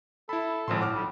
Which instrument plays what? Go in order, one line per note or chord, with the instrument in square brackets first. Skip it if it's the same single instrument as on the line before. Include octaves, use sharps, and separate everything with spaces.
[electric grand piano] E4 B5 [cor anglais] A4
[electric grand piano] G#1 F3 C6 [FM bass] A2
[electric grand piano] F#5 D6 F6
[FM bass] B1 [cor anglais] G3